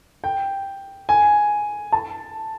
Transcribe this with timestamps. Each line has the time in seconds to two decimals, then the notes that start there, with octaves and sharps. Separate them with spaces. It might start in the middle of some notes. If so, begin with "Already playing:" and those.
0.24 G5
1.09 G#5
1.92 A5